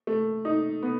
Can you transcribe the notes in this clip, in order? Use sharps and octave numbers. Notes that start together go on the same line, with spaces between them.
A3
D#4
B3